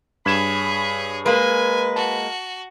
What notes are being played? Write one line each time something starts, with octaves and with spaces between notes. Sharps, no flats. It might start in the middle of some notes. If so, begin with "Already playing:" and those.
G2 G#4 C#5 B5 G#6 E7
G#3 A#3 B4 G#5
F#4 A5